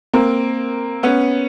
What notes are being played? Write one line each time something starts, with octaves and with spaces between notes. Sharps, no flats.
A#3 C4
B3 C#4